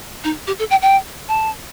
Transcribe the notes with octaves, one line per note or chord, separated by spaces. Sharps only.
D#4
G4
A4
G5
G5
A5